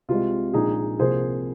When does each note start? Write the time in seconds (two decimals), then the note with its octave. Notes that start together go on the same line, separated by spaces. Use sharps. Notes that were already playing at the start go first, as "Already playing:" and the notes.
0.09 C2 C3 G#3 F4
0.53 A#1 A#2 G#3 D#4 G#4
0.99 C2 C3 F3 A#3 G#4 C5